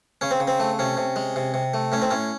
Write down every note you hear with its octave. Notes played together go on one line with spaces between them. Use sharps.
C#3 C#4
C4
C#3
C4
A3
C3 C#4
C3
G#3
C3
C3
A3
A2 C#4
C4
A2 C#4